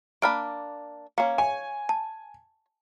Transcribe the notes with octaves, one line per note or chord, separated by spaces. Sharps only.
A#3 D4 B5 F6 D7
A#3 C#4 F5 C#7
C#5 G#5
A5